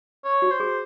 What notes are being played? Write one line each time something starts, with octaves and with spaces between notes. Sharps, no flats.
C#5
F#4
C5
G#4